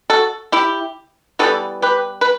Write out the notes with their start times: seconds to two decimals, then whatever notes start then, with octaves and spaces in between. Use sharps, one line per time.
0.10 F#4 A4
0.52 E4 G4
1.39 E3 G3 B3 F#4 A4
1.82 G4 B4
2.21 B4